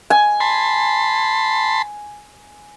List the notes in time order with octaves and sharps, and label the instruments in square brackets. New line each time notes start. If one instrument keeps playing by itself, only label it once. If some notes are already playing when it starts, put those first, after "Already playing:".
[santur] G#5
[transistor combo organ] A5 B5 C6